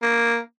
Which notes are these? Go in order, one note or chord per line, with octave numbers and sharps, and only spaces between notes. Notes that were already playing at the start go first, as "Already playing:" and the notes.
A#3